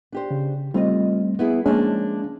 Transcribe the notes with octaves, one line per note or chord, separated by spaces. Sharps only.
D4 G4 C5
C#3
G3 A3 C4 F4 D#5
B3 E4 G#4
F3 G#3 A#3 C#4 D4